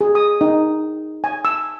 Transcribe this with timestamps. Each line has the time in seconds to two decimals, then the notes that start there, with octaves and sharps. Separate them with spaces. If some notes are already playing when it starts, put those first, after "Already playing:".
0.01 G#4
0.15 D#6
0.41 D#4
1.24 G#5
1.45 E6